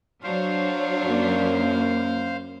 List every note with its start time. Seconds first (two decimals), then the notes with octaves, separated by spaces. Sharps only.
0.23 F#3 D4 C5 C#5 F5
1.06 F#2 A#3